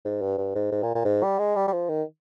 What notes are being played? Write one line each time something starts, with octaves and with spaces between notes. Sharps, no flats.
G#2
G2
G2
G#2
G#2
A#2
A#2
G#2
G3
G#3
G3
G3
F3
D#3